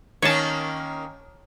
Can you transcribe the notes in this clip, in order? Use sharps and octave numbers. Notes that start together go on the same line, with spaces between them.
D#3 A#3 C#4 C#5 D#5 A5